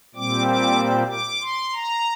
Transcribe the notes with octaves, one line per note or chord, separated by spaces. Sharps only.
A#2 G3 C4 D6
D6
D6
C6
A#5